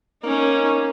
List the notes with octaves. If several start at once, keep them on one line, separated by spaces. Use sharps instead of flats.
A#3 C#4 D#4